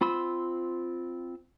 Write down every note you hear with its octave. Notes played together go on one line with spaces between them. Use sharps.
C4 F4 B5 C6 E6